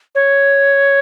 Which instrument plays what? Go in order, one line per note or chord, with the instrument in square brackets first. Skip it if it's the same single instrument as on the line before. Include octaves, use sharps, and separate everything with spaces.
[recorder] C#5